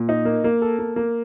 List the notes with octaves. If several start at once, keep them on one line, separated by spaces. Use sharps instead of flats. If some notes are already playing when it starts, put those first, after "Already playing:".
Already playing: A#2
D#4
A#3
A#3
A4
A#3
A#3